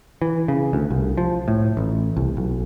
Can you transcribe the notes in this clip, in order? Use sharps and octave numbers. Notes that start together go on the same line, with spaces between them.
E3
C#3
D2
C2
F3
A2
A1
C2
B1